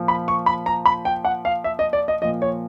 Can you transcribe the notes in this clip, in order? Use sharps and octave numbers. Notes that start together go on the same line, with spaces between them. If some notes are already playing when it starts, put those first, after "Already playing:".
Already playing: A#2 F3
B5
C#6
B5
A#5
B5
G5
F#5
F5
E5
D#5
D5
D#5
A#2 F3 D#5
C#5